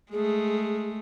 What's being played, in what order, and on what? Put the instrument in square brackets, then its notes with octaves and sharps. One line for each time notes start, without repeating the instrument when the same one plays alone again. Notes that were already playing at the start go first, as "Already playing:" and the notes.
[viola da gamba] G#3 A3 [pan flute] G#4